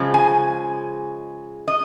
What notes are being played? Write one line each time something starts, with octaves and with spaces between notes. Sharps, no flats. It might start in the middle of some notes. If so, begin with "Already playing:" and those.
Already playing: C#3 F3 G#3
G#5
D#5